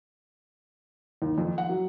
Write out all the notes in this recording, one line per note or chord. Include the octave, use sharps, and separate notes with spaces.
D#2
F2
F#5
F#3